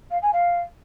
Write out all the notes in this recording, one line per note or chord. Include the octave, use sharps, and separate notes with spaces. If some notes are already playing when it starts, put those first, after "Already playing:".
F5
G#5
F5